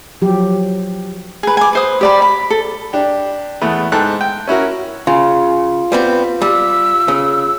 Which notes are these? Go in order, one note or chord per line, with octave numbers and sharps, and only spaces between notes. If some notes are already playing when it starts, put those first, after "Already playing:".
F3 F#3 G4
G#4 B4
G#5 D6
B4 C5 D#6
G4 D5 B5
B5
A4
D4 G4
E2 A3 B3
G#2 A4 G5 F#6
G5
C#4 E4 F#4 A#4
C#3 F4
G3 B3 C4
G3 E6
C#3